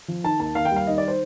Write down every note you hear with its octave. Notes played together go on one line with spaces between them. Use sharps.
F3
D#3 A5
D#2 A5
D#2 F5
G5
G3 F5
D#3 D#5
D5
C5